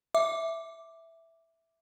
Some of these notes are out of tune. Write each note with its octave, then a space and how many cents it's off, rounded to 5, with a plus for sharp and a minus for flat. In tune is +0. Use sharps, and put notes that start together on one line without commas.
E5 +0 D6 +0